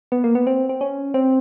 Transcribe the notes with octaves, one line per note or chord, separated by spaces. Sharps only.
B3
A#3
B3
C4
C4
C#4
C4